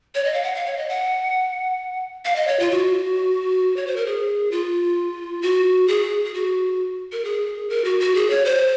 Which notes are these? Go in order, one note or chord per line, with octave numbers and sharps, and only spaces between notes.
C#5
D#5
F5
F#5
F5
C#5
D#5
F#5
F5
D#5
C#5
F4
F#4
C#5
C5
A#4
G#4
F4
F#4
G#4
G#4
F#4
A#4
G#4
A#4
F#4
F#4
G#4
C#5
C5